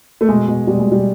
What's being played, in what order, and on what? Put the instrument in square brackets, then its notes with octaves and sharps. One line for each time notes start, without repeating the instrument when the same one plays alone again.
[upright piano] A3
B2 G#3
B2
B2 G3
G#3
B2 G3